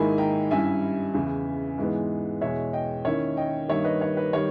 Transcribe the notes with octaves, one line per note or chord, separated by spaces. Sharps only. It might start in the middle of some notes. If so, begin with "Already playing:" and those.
Already playing: G#2 D#3 A#3 E4 G#5 B5
G5 A#5
G2 G3 C#4 E4 E5 G#5
E2 C#3 E3
G#2 E3 G#3 B3
E2 B2 G#3 C#5 E5
D#5 G5
D#3 A#3 C#4 E4 C#5 E5
D#5 G5
G2 D#3 G3 A#3 C#5 E5
B4 D#5
C#5
B4
D#3 G3 C#5